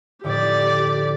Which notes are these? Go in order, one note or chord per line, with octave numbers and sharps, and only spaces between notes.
F2 A2 D3 G4 D5